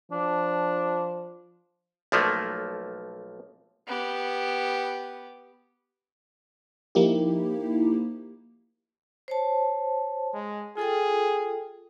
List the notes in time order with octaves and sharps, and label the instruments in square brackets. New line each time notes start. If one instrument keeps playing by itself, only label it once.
[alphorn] F3 [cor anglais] D4
[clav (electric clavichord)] B1 F3 A3 A#3
[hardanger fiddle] B3 G4
[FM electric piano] F3 A#3 D#4 E4 G4
[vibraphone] C5 C#5 A5
[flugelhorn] G#3
[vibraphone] F4 A4 G5 [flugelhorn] G#4